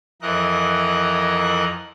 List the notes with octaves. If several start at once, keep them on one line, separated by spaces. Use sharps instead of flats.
F2 E3 A#4 D#5 F#5 F#6